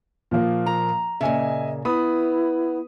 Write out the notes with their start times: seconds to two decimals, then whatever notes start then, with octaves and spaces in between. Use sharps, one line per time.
0.31 A#2 F3 A#3
0.66 A#5
1.21 A#2 C#3 D#5 E5 G#5
1.85 B3 E4 B5 D#6